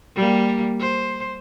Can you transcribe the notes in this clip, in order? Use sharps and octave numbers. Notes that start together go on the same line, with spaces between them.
G3 A#3
C5